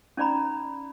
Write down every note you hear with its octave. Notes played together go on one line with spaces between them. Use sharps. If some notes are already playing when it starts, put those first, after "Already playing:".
C#4 D#4 D5 A#5 B5